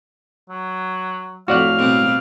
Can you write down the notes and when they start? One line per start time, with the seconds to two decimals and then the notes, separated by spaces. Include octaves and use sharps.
0.50 F#3
1.48 F2 A2 F#4 D5 F5 F#5
1.78 B2 G3 C4